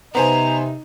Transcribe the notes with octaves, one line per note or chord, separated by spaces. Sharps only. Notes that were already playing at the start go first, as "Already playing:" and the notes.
C3 B3 D#4 C5 G#5 A#5